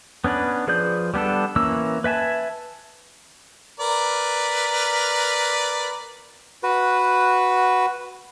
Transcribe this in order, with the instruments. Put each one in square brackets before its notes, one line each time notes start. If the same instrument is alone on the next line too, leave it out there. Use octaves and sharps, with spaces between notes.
[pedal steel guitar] B3 C#4 D4 B4
F3 G#4 B4 D5 G6
G3 B3 D4 A4
E3 A#3 C#4 E6
B4 E5 G#5 A5
[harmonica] A#4 B4 D5
[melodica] F#4 B4